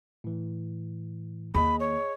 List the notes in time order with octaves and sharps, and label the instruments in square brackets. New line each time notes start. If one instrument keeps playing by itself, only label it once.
[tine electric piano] A2 E3
[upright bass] D#2 [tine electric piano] G#4 D#5 [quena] B5
[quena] C#5